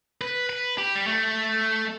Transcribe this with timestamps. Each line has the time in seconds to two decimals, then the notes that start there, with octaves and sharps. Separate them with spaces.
0.21 B4
0.49 B4
0.78 G4
0.95 G3
1.07 A3